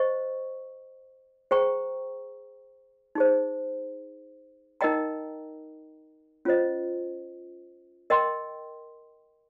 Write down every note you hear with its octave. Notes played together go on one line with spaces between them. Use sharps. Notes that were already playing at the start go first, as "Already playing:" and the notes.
Already playing: C5 D#5 C#6
G#4 C5 G5 A#5 C#6
D#4 G#4 C5
D#4 A#4 D#5 G5 A#5
C#4 F4 C5 D#5
A#4 D#5 G5 C6